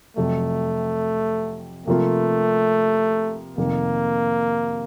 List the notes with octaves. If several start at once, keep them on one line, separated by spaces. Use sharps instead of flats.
F2 C3 F#3 A3
C3 F3 A3 A#3 F4
F2 C3 D#3 A3 A#3